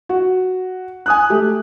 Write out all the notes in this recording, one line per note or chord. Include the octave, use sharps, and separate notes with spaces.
F#4
G#5 D#6 F#6
A3 G4